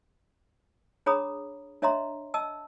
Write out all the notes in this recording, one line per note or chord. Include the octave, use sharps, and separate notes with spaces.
D4 G#4 C#5 A#5 B5 D#6
D4 C#5 D#5 E5 A#5 C6
D#5 A5 E6